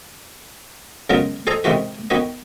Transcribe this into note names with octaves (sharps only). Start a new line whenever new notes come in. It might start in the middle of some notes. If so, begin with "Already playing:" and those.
C#3 F#3 G#3 B3 F4 A#4
G#4 A4 C5 D#5 A#5
C3 D#3 G#3 F4 F#4 B4
D#3 B3 F#4 B4 D#5